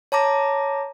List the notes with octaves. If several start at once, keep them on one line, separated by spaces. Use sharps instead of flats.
C#5 A5 A#5 D6 A#6